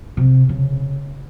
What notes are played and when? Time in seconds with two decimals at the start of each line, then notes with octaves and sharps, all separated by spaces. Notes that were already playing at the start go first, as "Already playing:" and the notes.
0.17 C3
0.49 C#3